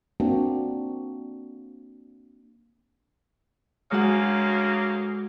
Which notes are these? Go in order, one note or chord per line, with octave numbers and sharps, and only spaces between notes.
A#3 C4 D4 F#4
D2 C#3 G#3 A#3 F#4 F#5